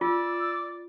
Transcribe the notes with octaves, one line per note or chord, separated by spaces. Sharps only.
F4 D5 E6